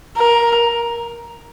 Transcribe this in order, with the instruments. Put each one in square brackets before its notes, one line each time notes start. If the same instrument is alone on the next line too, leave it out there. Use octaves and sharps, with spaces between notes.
[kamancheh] A#4